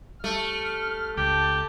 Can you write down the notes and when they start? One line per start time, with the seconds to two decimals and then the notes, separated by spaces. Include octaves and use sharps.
0.24 G3 A3 F6
1.17 C#2 G4 A5